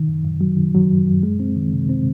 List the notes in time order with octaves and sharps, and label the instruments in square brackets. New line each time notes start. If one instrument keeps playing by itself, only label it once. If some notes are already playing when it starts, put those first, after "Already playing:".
Already playing: [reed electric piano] D#3
F#2
F#2
F#3
D#3
F#3
F#2
F#2
G#3
C4
D#3
C3
C4